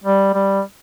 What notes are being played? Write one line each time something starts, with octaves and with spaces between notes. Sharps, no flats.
G3
G3